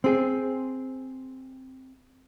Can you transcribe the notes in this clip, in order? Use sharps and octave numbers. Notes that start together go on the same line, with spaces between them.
C4 G#4